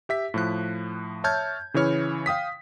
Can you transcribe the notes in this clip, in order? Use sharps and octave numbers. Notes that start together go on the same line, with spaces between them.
G4 E5 B6
A2 F3 F#6
C#5 E5 A5 F6 G6 G#6
C#3 E3 E4 C#5 F6
F5 G5 D#6 B6